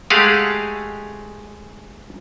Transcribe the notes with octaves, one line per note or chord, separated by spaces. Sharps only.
G#3 A3 G4 G#4 F5 F#5